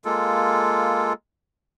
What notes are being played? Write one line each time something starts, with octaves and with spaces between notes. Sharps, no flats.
G#3 A#3 F4 A4